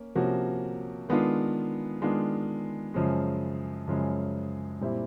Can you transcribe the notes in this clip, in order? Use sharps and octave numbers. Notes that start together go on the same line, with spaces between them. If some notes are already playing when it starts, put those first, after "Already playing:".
Already playing: A#3 C#4
C3 F3 A#3 C#4 F#4
D#3 G#3 B3 D4 F4
D#3 G#3 B3 D4 F4
F#2 C#3 F3 G#3
F#2 C#3 F3 G#3
A#2 G3 C4 E4